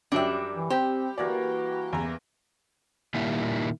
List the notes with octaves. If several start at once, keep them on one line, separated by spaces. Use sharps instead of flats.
F#2 F#3 G3 D4 E5 G5
E3
C4 G4 C5
E3 A#3 F#4 A#4 D5
E2 A#5
A#2 D#3 G3 A#3 E4